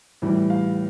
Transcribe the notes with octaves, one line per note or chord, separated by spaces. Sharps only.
A2 E3 G3
F5